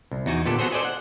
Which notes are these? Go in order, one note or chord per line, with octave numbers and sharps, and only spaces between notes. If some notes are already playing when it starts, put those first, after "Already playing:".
C2
E2 D#4 F#4 G#5
A#2 D3 B3 G4 A4
B3 F#4 G#4 A4 C5
A4 C5 D5 D#5 G#5
F#5